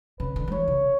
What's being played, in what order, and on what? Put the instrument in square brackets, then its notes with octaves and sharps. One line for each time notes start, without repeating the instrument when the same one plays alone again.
[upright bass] C#3 [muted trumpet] B4
[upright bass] D3
F#3
[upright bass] E3 [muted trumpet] C#5
[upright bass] C#3